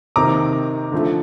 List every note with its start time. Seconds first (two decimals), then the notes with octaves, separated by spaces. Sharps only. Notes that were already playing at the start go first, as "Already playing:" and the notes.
0.16 C3 D#3 A#3 A#5 D6
0.92 D3 F3 A3